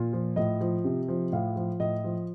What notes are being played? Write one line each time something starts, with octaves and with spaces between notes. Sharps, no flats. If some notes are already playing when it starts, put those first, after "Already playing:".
Already playing: A#2 F4
F3
A2 D#5
F3
C3
F3
A2 F5
F3
A2 D#5
F3